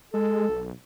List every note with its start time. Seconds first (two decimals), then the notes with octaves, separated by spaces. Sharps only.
0.14 G#3 A4
0.49 B1